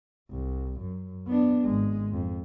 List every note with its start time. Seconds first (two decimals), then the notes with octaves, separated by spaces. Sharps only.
0.30 C2
0.80 F#2
1.27 B3 D4
1.65 G#1 G#3
2.13 F2